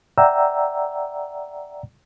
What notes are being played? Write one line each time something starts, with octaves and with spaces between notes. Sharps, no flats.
D5 E5 F#5 G5 A#5 E6